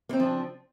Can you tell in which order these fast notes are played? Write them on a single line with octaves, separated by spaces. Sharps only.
A#3 C4 C#3 F3 D4